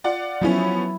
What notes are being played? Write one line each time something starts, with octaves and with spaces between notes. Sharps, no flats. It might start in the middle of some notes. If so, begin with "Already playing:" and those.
F4 D5 F#5
F3 F#3 B3 C#4 E4